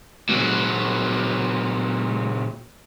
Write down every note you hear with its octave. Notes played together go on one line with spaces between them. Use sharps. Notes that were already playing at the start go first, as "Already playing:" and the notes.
A#2 F#3